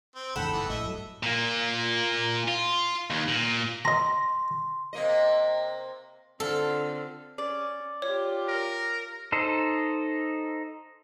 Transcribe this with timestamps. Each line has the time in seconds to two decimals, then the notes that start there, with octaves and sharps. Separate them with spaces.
0.16 C4
0.36 E2 G#2 C#3 A4 F#5 G5 B5
0.53 F#1 E3 B3
0.69 A#1 A2 D#5 E5
0.83 G2 F#3
1.23 A#2 A#3
2.48 F4
3.10 D#2
3.28 A#2
3.85 D#5 A#5 C6
4.93 C3 A#3 D#5
6.40 D3 C4 F4 A4 F5
7.38 C#4 D5
8.02 F4 G4 C#5
8.48 A#4
9.32 D#4 A4 C5